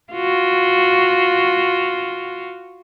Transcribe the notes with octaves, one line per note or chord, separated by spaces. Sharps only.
F4 F#4